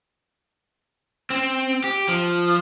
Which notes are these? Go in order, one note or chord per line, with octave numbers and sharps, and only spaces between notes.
C4
G4
F3